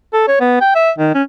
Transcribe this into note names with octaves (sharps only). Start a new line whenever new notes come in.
A4
C#5
B3
G5
E5
D#3
C#4